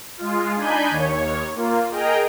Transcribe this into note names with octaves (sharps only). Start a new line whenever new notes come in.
G#3 F4
D4 D#4 G#5 B5 G6
D#2 C#5
A#3 F4
G#4 A#4 D#5 G5 A#5